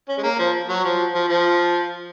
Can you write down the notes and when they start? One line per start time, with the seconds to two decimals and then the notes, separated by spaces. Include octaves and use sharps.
0.09 C#4
0.18 G#3
0.23 A#3
0.39 F3
0.69 F#3
0.84 F3
1.14 F3
1.29 F3